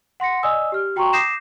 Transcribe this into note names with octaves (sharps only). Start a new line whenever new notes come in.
F#5 C6 A#6 C#7
D5 D#5 G#5 D#6 E6
G4 F6
F#4 G5 A#5 C6 C#6
D6 D#6 G6 A#6 C7 E7